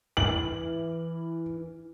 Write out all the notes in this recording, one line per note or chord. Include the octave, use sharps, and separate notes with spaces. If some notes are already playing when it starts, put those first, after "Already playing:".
E3 F#7